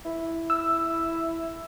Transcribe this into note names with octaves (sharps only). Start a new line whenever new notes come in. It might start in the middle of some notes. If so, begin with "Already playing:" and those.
E4
E6